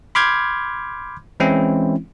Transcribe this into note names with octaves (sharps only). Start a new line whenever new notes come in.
B5 C6 D6 F6 G6 G#6
E3 G#3 C4 C#4 E4